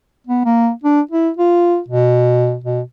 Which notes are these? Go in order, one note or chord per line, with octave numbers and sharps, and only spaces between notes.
B3
A#3
D4
E4
F4
B2
B2